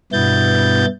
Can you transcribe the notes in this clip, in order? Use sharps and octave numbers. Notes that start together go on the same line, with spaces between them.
G2 B2 B3 E4 G6 A6